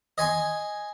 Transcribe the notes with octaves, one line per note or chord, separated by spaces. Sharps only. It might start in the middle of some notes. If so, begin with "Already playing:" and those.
D#5 G#5 C6